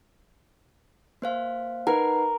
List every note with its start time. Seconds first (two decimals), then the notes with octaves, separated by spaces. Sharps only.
1.22 A#3 C5 F5
1.87 D#4 A#4 B4 F#5